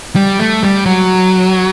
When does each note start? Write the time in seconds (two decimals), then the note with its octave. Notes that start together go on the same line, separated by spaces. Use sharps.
0.16 G3
0.39 A3
0.63 G3
0.86 F#3